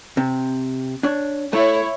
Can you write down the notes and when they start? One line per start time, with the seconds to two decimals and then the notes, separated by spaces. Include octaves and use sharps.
0.17 C3
1.03 D4 C#5
1.53 A3 E4 C#5